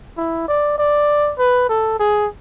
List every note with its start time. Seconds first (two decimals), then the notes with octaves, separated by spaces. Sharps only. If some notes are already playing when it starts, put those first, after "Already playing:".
0.17 E4
0.48 D5
0.78 D5
1.39 B4
1.69 A4
2.00 G#4